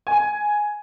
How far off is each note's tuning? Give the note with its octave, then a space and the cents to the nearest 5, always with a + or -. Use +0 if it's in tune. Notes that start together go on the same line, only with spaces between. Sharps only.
G#5 +5